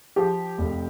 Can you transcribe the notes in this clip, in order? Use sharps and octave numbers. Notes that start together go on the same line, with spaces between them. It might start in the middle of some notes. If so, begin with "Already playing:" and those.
F3 G4
F1